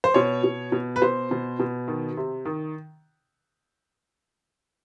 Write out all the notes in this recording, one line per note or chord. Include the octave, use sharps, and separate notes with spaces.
C5
B2 C#5
B2
B2
B4
B2 C5
B2
B2
D#3
C3
D#3